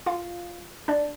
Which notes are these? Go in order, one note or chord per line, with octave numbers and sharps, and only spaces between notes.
F4 F5
D4 D5